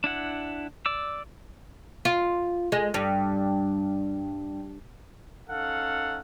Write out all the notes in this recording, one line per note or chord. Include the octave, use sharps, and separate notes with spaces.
D4 E4 F#5
D5 D6 E6
F4
G#3
G2
C#4 D#4 A4 F5 F#5